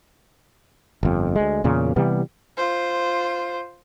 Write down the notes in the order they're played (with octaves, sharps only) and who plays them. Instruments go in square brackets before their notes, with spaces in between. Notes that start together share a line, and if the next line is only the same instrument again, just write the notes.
[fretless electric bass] G1 F2
D2 G#3
E2 A#2 C#3
C3 E3 G3 B3
[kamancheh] F4 C5